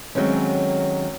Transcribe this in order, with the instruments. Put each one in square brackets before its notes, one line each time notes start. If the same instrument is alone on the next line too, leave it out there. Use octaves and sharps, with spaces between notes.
[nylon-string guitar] D#3 F#3 G#3 A3 C4 C#4